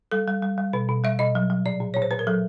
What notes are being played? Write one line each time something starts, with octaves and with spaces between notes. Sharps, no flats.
G3 A4
G3
G3
G3
B2 B4
B2
G3 E5
B2 D#5
F#3
F#3
A#2 D5
A#2
A#2 C#5
C5
A#2 B4
A#4
F#3 A4